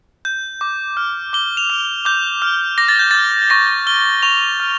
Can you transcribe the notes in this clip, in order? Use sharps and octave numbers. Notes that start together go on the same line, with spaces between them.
G6
D6
F6
D6 G7
F7
F6
D6 G6
F6
D6 A#6
A6
G6
F6 A6
C#6 A#6
F6 G7
C#6 F7
F6